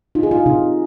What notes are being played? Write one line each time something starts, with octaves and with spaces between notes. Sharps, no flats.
D#4 F4
G#4
F4
C3 D#4